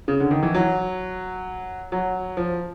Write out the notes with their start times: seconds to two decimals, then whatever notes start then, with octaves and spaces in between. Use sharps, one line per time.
0.08 C#3
0.20 D3
0.31 D#3
0.43 E3
0.55 F#3
1.92 F#3
2.37 F3